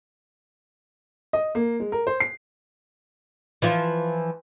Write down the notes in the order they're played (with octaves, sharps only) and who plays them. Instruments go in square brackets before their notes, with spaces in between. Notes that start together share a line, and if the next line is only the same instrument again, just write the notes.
[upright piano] D#5
A#3
G#3
A#4
C5
C7
[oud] E3 F3 F4